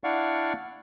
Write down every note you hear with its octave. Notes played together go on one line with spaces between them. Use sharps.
D4 E4 D5 F5 F#5 C#6